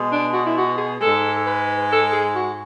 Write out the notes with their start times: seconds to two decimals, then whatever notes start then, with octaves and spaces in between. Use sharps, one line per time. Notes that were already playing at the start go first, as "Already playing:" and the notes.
Already playing: B2 G#3
0.12 D4
0.34 F#4
0.46 E4
0.57 F#4
0.78 G#4
1.01 G#2 G#3 A4
1.46 B4
1.90 A4
2.13 G#4
2.35 F#4